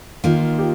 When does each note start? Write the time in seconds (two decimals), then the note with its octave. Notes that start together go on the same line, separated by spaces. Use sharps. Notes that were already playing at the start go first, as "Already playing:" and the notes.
0.24 D#3 A#3 D#4 F4
0.58 G4